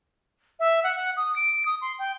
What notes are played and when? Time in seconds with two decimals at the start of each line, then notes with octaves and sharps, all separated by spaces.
0.60 E5
0.84 F#5
0.96 F#5
1.17 D#6
1.36 D7
1.66 D#6
1.81 C6
1.99 G5